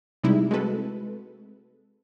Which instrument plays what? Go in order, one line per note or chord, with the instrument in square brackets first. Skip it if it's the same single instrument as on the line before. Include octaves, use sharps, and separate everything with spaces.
[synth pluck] C3 G3 G#3 D#4 E4
G#3 A3 C4 F#4 A4 B4